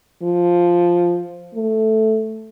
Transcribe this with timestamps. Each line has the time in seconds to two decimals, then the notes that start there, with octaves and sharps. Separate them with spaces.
0.22 F3
1.55 A3